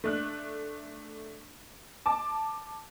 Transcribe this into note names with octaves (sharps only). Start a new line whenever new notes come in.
A3 D4 F#6
A5 D6